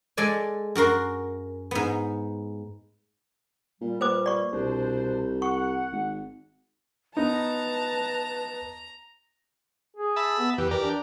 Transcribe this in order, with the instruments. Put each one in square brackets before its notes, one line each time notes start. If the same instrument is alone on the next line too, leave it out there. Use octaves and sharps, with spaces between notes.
[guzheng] G#3 A4 D5 G#5
F#2 F#4 A#4 C6
G#2 B3
[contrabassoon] A#2 [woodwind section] G3
[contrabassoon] A#2 [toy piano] B4 C5 D6
[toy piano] D5 C#6
[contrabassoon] C2 [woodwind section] B2 D4 C5
[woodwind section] F#5 [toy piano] C#6
[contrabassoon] G#1
[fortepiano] B3 D#4 [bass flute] B4 [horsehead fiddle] A5 [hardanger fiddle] A#5
[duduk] G#4
[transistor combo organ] E5 A5 B5
[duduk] B3
[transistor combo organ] E2 G4 [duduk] B4
[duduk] E3 [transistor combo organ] G4 A#4 D5
[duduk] D4